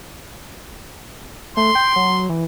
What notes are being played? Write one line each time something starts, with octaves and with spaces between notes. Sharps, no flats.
A3 C6
G5
F#3
E3